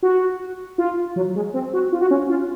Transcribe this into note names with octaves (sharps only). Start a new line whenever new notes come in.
F#4
F4
F#3
G#3
C4
F#4
F4
F#4
C#4
F4